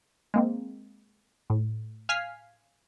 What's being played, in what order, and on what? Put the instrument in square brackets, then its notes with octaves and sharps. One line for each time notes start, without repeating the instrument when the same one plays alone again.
[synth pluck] G#3 A#3 C4
A2
F5 G#5 F6 B6 C7